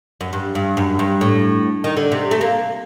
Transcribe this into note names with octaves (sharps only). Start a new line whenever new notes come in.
F#2
G2
G2
F#2
G2
A2
D#3
D3
C3
A3
A#3